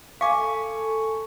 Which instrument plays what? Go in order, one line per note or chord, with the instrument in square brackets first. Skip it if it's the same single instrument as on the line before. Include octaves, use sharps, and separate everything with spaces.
[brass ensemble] A4 [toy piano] F5 D6 [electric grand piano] G#5 C#6